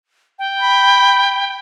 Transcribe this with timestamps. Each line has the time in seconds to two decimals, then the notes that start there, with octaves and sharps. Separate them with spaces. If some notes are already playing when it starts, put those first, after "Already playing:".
0.39 G5
0.59 B5